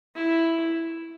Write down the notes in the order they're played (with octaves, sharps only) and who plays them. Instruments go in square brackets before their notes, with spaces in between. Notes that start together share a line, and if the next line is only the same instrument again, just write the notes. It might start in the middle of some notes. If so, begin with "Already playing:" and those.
[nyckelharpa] E4